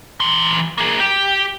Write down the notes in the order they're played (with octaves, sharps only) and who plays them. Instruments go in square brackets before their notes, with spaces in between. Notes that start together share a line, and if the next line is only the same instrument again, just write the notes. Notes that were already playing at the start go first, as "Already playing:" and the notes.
[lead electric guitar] E3 C6
A#3 G#4
G4